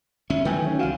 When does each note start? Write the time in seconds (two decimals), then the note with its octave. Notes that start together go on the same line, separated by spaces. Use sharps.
0.30 G1 C#4 E5
0.45 D#3 F#3 A3 B4 G5 G#5
0.67 C#4
0.79 C2 D3 F#4 F5